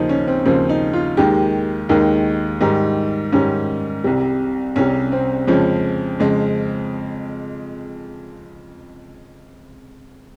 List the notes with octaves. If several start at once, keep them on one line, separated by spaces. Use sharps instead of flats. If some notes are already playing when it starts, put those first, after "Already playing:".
Already playing: D#2 C#3 F3 D#4
C#4
C4
D#2 C#3 F3 C4
D#4
F4
D#2 D#3 G#3 G4
D#2 D#3 G#3 D#4
G#2 D#3 G3 D#4
G#2 D#3 G3 C#4
C2 C3 G3
C2 C3 G3 C#4
C4
F2 C#3 F3 G#3 C#4
F2 C#3 F3 G#3